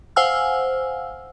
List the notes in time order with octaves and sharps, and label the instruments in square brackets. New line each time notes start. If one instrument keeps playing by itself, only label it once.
[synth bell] C5 F5 F#5 G#5 E6 F6